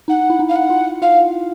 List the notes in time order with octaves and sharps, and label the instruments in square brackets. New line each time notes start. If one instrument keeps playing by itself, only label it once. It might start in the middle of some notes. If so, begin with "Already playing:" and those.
[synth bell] D#4 [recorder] F#5
[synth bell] E4
D#4
[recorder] F5
F#5
[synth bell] F4
[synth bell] F4 [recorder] F5